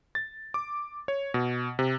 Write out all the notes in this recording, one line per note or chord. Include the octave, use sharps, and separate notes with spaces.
A6
D6
C#5
B2
C3